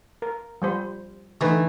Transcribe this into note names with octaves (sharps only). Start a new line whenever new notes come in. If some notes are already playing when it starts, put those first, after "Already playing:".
A#4
F3 G3 C5
D3 E3 A3 D#4 B4